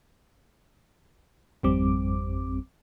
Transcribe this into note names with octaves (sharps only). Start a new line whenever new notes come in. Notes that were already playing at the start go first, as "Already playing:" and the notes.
G#1 F2 G3 C4 D6